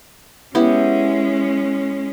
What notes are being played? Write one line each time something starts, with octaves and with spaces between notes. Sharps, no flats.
G#3 B3 C#4 E4 G4